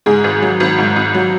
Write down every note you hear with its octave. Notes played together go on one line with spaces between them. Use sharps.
G#2 G#4
G#1
F#3
G#1
G#2
G#1
F#3